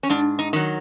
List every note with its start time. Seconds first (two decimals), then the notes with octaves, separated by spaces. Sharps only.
0.03 C#4
0.10 G#2 D4
0.39 D#4
0.53 D#3 F#3